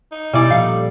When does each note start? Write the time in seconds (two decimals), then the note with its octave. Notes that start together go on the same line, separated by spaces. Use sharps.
0.12 D#4
0.34 B2 G3 E4 D5 G#5
0.50 A#2 F3 A4 F5